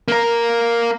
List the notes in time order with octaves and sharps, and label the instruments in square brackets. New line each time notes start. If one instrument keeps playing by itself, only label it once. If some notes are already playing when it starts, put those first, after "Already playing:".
[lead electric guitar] A#3 A#4